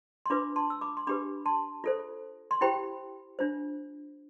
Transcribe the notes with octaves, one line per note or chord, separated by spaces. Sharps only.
C6
D4 F4 B4 B5 D6
A5 C6
E6
B5 D6
C6
D4 G4 B4 B5 D6
A5 C6
F4 A4 C5
C6
E4 G4 C5 G5 B5
D4 F4 C5